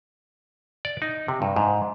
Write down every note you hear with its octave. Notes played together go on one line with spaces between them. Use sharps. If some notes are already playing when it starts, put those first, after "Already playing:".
D5
D#4
C3
G2
G#2